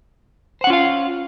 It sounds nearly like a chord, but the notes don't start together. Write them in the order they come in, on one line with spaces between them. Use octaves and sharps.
C5 F#5 C#4 F4 F5